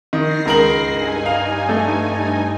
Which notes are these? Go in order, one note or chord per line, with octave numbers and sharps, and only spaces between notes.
D#3 A#6 C7
C#2 A#4 F#7
G2 D#4 G#5
F5
A3